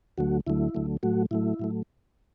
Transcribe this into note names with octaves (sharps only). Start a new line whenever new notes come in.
D2 D3 F#3 A3 F#4
D2 D3 F#3 A3 E4
D2 D3 F#3 A3
A2 F#3 A3 F#4
A2 F#3 A3 E4
A2 F#3 A3